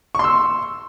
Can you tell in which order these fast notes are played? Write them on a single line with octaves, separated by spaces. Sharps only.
C#6 C6 E6